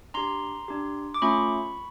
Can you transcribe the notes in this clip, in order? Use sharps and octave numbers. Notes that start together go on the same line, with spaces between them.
D4 G4 A#5 C6
D4 G4
D6
A3 C#4 F4 B5 C#6